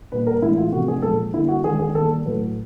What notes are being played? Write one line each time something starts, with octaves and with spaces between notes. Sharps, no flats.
A#2 G3 A#3 B4
A#4
A2 E3 G#3 E4
F4
C3 F3 A3 F#4
G#4
A#2 F3 G#3 A4
D3 G3 A#3 E4
F#4
D#3 G#3 G#4
G#4
D#3 G3 A#3 A4
A2 F#3 A3 B4